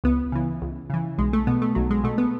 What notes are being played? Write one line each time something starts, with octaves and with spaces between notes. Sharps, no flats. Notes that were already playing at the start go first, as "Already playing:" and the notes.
C#2 B3
C#3 E3
C#2
C#3 E3
B1 G#3
A3
B2 B3
A3
B1 F#3
G#3
B2 A3
B3